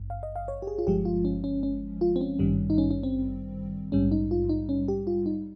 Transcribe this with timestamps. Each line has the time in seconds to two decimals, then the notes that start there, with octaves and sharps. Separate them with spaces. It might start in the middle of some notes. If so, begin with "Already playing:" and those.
Already playing: G#1 G2
0.10 F5
0.23 D#5
0.36 F5
0.48 C#5
0.62 G4
0.67 G#4
0.79 F4
0.87 G1 G2 F3 G#3 G4
1.05 F4
1.25 C#4
1.44 C#4
1.63 C#4
2.01 F4
2.16 C4
2.21 C#4
2.39 G#1 G2 D#3 G3
2.70 D#4
2.78 C#4
2.91 C#4
3.03 C4
3.92 A#1 G#2 G3 C#4
4.12 D#4
4.31 F4
4.49 D#4
4.69 C#4
4.88 G4
5.07 F4
5.26 D#4